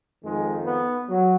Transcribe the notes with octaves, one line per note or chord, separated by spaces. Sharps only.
F2 D#3 G#3
B3
F#3